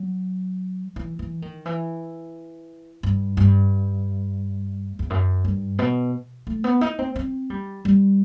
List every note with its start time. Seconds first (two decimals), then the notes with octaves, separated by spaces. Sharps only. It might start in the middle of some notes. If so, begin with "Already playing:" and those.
Already playing: F#3
0.96 E3
1.19 E3
1.42 D#3
1.66 E3
3.03 G2
3.37 G2
4.99 E2
5.10 F#2
5.44 G2
5.79 B2
6.47 A3
6.64 B3
6.81 D#4
6.99 C4
7.16 C4
7.50 G3
7.85 G3